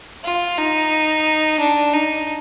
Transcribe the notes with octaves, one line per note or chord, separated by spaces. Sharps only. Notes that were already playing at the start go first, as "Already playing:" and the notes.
F4
D#4
D4
D#4